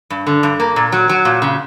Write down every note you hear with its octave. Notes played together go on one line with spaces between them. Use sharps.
G2
D3
G2
A#3
A#2
F#3
F#3
A#2
C#3